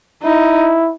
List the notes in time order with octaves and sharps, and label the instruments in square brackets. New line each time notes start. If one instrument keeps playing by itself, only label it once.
[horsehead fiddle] D#4 [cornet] E4